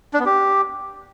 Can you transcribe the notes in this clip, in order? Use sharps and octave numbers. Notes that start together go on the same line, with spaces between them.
D4
B3
G4